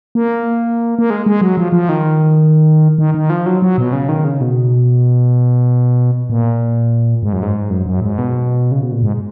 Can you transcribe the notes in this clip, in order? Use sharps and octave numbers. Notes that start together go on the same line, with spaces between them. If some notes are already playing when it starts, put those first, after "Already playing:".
A#3
A#3
G#3
G#3
F#3
F3
F3
D#3
D#3
D#3
F3
F#3
F#3
B2
C#3
D#3
C#3
B2
A#2
G#2
F#2
G#2
F#2
F#2
G#2
B2
C#3
B2
A#2
G#2